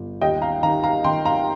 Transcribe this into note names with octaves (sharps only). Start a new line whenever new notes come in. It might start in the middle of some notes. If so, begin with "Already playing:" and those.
Already playing: G1
D#2 D#5 G5
F5 A#5
D#3 F5 A#5
F5 A#5
D#3 G5 C6
F5 A#5